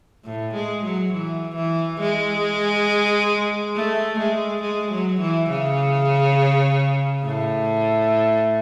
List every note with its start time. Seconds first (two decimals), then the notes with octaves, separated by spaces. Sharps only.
0.24 A2
0.54 G#3
0.84 F#3
1.12 E3
1.56 E3
2.00 G#3
3.75 A3
4.18 G#3
4.62 G#3
4.91 F#3
5.20 E3
5.49 C#3
7.24 A2